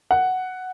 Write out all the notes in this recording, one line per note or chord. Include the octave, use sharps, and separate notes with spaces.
F#5